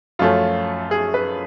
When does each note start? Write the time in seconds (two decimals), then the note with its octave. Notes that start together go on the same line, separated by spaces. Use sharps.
0.19 F#2 F3 A3 C#4 F4
0.91 G#4
1.14 B4